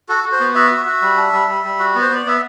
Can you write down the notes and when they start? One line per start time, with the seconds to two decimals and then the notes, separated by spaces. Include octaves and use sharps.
0.09 F#4 A4
0.24 F#4
0.32 C5
0.40 B3
0.55 F#4 E5
0.71 F#4
0.86 F#4
1.02 G3
1.17 D4
1.32 G3
1.48 G3
1.64 G3
1.79 F#4
1.95 B3
2.02 C5
2.10 B3 D5
2.26 B3 E5